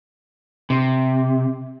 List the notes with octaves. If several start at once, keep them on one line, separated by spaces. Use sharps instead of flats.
C3